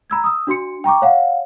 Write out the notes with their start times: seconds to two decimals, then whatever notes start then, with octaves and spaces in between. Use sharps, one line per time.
0.10 A#5 B5 E6 G#6
0.24 D#6 E6
0.47 D4 F#4 C6 C#7
0.84 G5 A#5 C#6 D6
1.02 C#5 F5 F#5